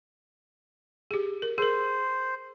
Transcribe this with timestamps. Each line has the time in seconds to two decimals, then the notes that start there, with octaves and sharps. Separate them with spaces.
1.11 G4 G#4
1.42 A#4
1.58 G#4 A#4 C5